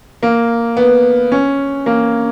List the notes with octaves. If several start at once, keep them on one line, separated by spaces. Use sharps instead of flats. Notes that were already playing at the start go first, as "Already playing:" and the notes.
A#3
B3
C#4
A#3